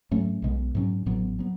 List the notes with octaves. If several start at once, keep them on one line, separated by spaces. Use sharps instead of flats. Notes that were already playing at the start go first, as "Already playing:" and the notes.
G#2 F#3 A3 C#4
B1 B2 G#3 B3
G#2 F#3 C#4
A1 A2 F#3 B3
F#3 B3